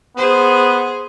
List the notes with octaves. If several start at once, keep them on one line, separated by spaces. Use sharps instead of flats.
B3 G#4 C5